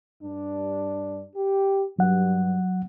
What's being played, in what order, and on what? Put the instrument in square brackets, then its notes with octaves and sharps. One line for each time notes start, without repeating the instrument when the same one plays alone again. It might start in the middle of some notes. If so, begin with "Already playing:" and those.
[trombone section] G2 D4
G4
[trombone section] G2 [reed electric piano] F#3 F#5